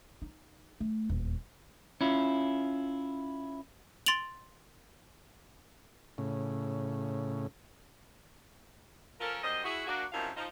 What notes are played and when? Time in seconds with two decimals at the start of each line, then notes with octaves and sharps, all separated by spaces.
0.22 D#4
0.80 A3
1.09 D#1 E2
2.01 C#4 E4 F4
4.06 C6 A6 D7 F7 F#7
6.18 A2 C#3
9.20 F3 C#4 A4 A#4
9.43 F#2 G3 C5 D#5
9.64 E4 F#4 G#4
9.87 A#3 D4 F#4
10.13 F#2 C3 D#3 F3 E4 F5
10.36 F3 D#4